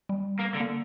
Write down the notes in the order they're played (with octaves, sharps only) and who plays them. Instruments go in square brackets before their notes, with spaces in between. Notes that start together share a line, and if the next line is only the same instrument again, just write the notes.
[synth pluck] G3
[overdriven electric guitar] A#3
D3
[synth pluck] A#3